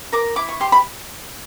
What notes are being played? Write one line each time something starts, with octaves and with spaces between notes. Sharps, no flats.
A#4 D6
E4 D6
C#6
G4 C6
B5